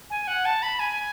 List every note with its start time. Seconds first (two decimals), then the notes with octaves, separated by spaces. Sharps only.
0.10 G#5
0.27 F#5
0.45 A5
0.62 B5
0.79 G#5